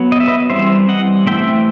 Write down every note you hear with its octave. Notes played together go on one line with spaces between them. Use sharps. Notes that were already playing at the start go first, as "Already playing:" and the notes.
Already playing: F#3 B3
D#5
E5
B4 D#5
E3 G3 C4 C5 E5
D#5 F#5
E3 A3 C4 E5 G5